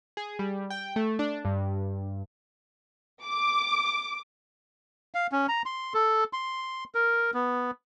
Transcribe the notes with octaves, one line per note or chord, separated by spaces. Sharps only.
G#4
G3
G5
A3
D4
G2
D6
F5
C#4
A#5
C6
A4
C6
A#4
B3